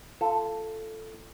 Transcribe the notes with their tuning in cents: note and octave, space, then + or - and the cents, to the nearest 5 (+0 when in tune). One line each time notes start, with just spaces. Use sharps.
F4 -20 A4 +0